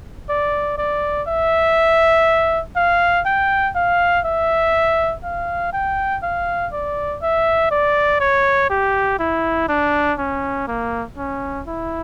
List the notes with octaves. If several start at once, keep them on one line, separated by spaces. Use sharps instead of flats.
D5
D5
E5
F5
G5
F5
E5
F5
G5
F5
D5
E5
D5
C#5
G4
E4
D4
C#4
A#3
C#4
E4